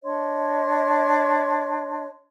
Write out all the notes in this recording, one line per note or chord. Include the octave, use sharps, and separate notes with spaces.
D4 C#5 D#5 C6